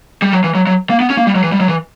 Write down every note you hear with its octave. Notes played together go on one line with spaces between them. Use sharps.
G3
F#3
E3
F#3
F#3
A#3
B3
C#4
A#3
G3
F#3
E3
G3
F#3
E3